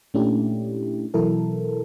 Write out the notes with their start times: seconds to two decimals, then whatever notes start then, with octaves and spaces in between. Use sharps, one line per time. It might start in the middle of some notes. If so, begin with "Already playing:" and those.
0.14 A#2 A3 C#4 D4 E4 G4
1.14 B2 E3 F#3 E4 A4 A#4